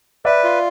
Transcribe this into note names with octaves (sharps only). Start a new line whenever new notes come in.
B4 D5 E5
F4